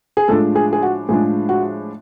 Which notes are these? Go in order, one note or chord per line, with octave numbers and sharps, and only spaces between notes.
G#4
A2 F3 G#3 D4 A4
G#4
G#4
F#4
A2 F3 G#3 D4 G#4
F#4